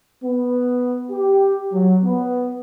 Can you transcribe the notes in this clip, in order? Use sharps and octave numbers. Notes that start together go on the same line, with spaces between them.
B3
G4
F#3
B3